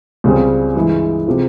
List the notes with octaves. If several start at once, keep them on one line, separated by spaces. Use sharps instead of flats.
C#2 C#3 G3 C4
G2 E3 G#3 E4
C3 F3 G#3